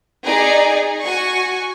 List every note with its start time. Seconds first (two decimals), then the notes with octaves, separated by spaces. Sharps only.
0.24 D#4 G#4 D5
1.00 F#4 G#5 C#6